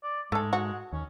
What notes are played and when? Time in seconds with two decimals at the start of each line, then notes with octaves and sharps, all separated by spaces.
0.03 D5
0.32 G#2 G#3 A3 A4
0.53 F#4
0.93 D#2 C#4